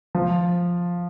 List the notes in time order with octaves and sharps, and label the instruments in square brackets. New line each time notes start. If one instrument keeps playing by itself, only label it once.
[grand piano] F3